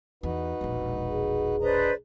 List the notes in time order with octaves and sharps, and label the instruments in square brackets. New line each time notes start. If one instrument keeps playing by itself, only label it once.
[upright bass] E2 [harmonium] D#4 F#4 B4
[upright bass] E1 A#1
[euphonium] G#4
[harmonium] D4 D#5 A#5 [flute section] B4 C5 D5